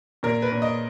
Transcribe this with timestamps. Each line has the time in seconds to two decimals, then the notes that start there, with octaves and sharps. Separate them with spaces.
0.23 A#2 A#4
0.42 B4
0.52 A#2
0.62 D#5